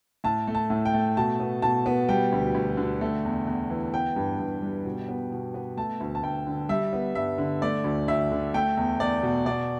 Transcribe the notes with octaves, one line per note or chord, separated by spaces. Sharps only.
A2 A5
A3
A5
A2
G5
A3
B2 A5
B3
B2 A5
B3
G3 G5
D2
D2
D3
A3
E2
E2
E3
B3 G5
G2
G2
G3
B2
B3
B2
B3
A3 A5
D2
A5
D2 G5
D3
G3 E5
B3
G2 E5
D3
A3 D5
D2
D2 E5
D3
A3 G5
E2
E2 D5
B2
B2 D5